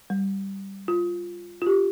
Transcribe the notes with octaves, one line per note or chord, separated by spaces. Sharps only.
G3
F4
F4
G4